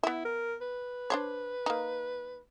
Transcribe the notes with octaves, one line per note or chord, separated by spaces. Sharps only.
B3 E4 E5
A#4
B4
D4 C5 C#5
A#3 D#4